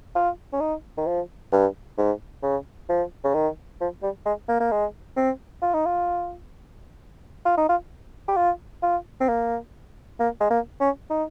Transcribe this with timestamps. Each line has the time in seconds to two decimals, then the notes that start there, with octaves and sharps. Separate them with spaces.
0.15 F4
0.53 C#4
0.60 D#4
0.98 D#3
1.07 F3
1.52 G2
1.98 G#2
2.42 C#3
2.89 F3
3.24 C#3
3.34 D#3
3.81 F3
4.03 G3
4.25 G#3
4.48 A#3
4.60 A#3
4.71 G#3
5.16 C4
5.62 F4
5.74 D#4
5.85 F4
7.45 F4
7.57 D#4
7.69 F4
8.28 G4
8.36 F4
8.83 F4
9.20 C4
9.29 A#3
10.19 A#3
10.40 G#3
10.50 A#3
10.80 C#4
11.10 D#4